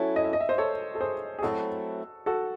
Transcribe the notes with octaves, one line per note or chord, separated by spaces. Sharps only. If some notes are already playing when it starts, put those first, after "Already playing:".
Already playing: F#3 C#4 E4 A4
D#5
E5
D#5
E5
C5 D#5
A4 C#5
A4
G#4 C5
G#4
F#3 A3 C4 E4 F#4 A4
F#4 A4